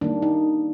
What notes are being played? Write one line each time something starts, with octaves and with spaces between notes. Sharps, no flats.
D#3 G3 A#3 D4
D#4